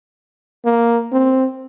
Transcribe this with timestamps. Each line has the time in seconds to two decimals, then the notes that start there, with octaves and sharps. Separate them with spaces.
0.65 A#3
1.12 C4